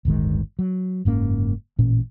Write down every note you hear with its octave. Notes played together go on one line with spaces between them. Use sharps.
D1 G1 D#3 G#3
F#3
F#1 G#2 A#3 C#4
A1 A#2 C#4